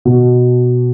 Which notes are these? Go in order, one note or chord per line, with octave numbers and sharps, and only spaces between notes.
B2